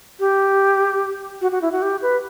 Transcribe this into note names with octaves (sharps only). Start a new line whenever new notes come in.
G4
F#4
F#4
E4
F#4
G4
B4